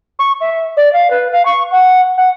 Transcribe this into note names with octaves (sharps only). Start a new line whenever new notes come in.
C#6
E5
D5
F5
B4
F5
C#6
F#5
F#5